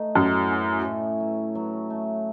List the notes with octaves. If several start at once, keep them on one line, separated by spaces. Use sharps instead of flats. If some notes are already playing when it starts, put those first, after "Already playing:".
Already playing: A3 D#4
F#2 A2
C#4
A2
F#3
F#3
A3